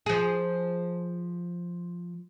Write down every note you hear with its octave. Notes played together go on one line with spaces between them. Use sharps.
F3 G#4